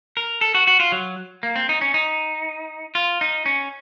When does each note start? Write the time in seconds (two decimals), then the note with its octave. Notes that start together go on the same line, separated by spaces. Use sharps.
0.17 A#4
0.41 A4
0.55 F#4
0.67 F#4
0.80 F4
0.92 F#3
1.43 A#3
1.56 C4
1.69 D#4
1.81 C#4
1.94 D#4
2.95 F4
3.21 D#4
3.46 C#4